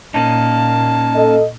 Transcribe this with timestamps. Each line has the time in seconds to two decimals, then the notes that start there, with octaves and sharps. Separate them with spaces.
0.14 A#2 A#3 C#4 D#4 A5
1.16 A4 D#5